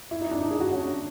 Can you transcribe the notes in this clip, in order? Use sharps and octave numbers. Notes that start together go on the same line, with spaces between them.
E4
D#4
D4
D#4
G#4
F#4
C#4
D4